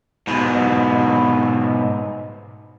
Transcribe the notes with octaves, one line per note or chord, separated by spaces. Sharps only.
G#2 B2